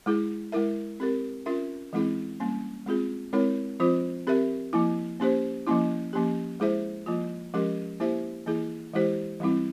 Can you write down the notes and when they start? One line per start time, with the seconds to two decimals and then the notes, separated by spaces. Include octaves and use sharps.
0.06 G#3 E4 G#4
0.52 G#3 E4 A#4 E5
1.00 C4 G4 A#4
1.46 C#4 F4 A#4 E5
1.93 E3 G#3 C4 E4 G#4
2.40 G3 A#3 C#4
2.86 G#3 C4 F4 G#4
3.33 G#3 C4 E4 A#4 C#5
3.80 F3 C4 F4 C5
4.27 C4 G4 A#4 E5
4.73 F3 A#3 E4
5.20 A#3 C#4 G4 C5
5.67 F3 A#3 C#4 E4
6.13 F3 A#3 C#4 G4
6.60 G#3 E4 G#4 C5 E5
7.06 F3 A#3 F4
7.54 F3 G#3 C#4 G4 A#4
8.00 A#3 E4 G4 C5 E5
8.46 E3 A#3 E4 G#4
8.94 E3 G#3 E4 G4 C5
9.40 E3 G3 C4 E4